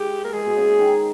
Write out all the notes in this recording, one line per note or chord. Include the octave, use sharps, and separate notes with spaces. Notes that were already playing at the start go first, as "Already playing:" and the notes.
Already playing: G#3 G4
A#4
G#3 G#4
B2
C#3
D#3